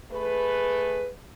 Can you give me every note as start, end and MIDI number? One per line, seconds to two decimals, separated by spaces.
0.11 1.07 57
0.11 1.07 68
0.11 1.07 71